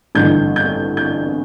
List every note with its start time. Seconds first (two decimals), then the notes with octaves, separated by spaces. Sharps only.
0.15 A1 G2 D3 G6
0.56 G6
0.97 G6